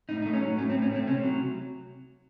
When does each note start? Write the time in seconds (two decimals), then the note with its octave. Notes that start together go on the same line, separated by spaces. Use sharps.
0.09 A2 D#4
0.22 A3 D#4
0.33 C#4
0.42 F#3
0.58 A2 C#4
0.70 C4
0.74 A2
0.82 C#4
0.91 A3 C4
1.07 C3 C#4
1.24 F#3